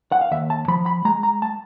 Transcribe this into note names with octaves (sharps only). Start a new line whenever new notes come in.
F#5
F5
D#2 E5
A5
F3 B5
B5
G#3 A#5
A#5
A5